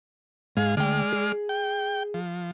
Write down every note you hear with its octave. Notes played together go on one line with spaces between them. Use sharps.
G#2 G#4 F5
D2 G#3 D5 G5 F6
G#4
G5
F3